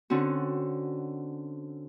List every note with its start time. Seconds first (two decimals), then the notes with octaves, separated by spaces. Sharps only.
0.10 D3 C4 C#4 F#4